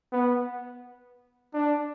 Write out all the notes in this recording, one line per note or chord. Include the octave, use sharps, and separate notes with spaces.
B3
D4